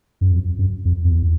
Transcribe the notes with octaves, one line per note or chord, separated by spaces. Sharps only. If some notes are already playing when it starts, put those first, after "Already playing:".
F#2
F2
F#2
F2
F2
E2